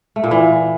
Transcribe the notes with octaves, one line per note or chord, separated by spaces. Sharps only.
A3
A#2
E3